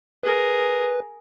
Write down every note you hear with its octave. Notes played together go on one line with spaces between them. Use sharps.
G#4 A#4 B4